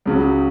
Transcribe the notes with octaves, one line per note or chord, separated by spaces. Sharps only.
C#2 C#3 F#3